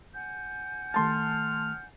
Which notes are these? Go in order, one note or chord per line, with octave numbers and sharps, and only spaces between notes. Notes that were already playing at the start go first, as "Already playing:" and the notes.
F#5 G#5 G6
D#3 A3 A5 C6 F6 A6